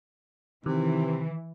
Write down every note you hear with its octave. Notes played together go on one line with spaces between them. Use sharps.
C3 D#3 E3